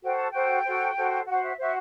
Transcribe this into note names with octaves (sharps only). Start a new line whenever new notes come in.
F#4 A4 C5 G5
A5
F#4 A4 C5 G5
F#4 A4 C5
F#4 A4 C5
F#4 C5 F#5
E5
F#4 C5 E5